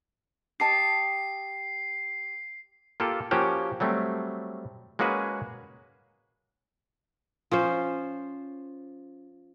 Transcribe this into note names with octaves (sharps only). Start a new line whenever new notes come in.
G4 D#5 A5 C7
A#3 F4 G4 A4
F3 A#3 C#4 F#4 G4
F#3 G3 A3 C4
G#3 A#3 C#4 F#4 G#4 B4
F3 C#4 C5